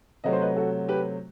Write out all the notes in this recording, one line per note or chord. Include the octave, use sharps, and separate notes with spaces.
C3 F#3 A3 D#5
C5
B4 D#5
F#4 A4
G4 B4